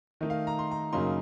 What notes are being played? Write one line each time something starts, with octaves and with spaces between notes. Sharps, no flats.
D#3 A3 D#4 D#5
F5
A#5
C6
A#5
F#2 C#3 F#3 A#3 D#4 C6